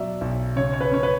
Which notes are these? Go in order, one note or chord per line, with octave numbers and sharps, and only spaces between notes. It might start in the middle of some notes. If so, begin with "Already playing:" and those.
Already playing: B2 F#3 D5 E5
B1
C#3 C#5
C#5
B4
C#4 C#5
B4